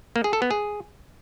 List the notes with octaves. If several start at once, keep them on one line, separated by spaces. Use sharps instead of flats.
A#3
G#4
A4
B3
G#4